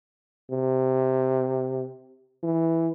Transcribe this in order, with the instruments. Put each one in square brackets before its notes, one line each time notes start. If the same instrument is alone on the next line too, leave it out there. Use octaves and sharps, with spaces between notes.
[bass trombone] C3
E3